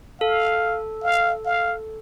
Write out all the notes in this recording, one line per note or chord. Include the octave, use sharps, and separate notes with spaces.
A4 F5
F5
F5